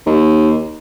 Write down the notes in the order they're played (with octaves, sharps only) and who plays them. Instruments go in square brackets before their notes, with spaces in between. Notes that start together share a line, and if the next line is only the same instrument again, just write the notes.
[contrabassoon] D#2